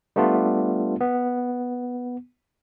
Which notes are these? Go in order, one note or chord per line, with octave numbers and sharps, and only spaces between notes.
G3 A3 B3 D4 F4
B3